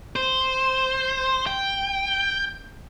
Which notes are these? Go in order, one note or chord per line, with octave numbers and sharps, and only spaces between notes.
C5
G5